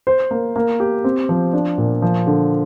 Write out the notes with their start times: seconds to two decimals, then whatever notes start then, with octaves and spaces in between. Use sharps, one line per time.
0.07 C5
0.31 A#3
0.56 A#3
0.80 G4
1.04 C4
1.29 F3
1.53 D4
1.78 A#2
2.02 F3
2.27 D3